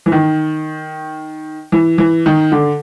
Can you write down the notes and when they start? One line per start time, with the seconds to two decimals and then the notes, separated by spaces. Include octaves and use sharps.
0.06 E3
0.12 D#3
1.72 E3
1.98 E3
2.26 D#3
2.52 D3